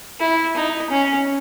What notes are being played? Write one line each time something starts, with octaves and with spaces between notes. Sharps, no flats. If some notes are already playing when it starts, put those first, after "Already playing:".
E4
D#4
C#4